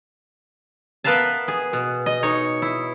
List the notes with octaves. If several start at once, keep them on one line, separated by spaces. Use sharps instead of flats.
B3 A#4 B4 E5 F5 A5
G#4
B2
D#5
D#4 C#5
E4